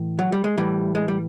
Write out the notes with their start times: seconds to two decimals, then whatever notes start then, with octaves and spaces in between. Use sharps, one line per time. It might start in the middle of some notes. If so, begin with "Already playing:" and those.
Already playing: A2 E3
0.19 F#3
0.32 G3
0.44 G#3
0.58 A2 E3 G3
0.95 G#3
1.08 G3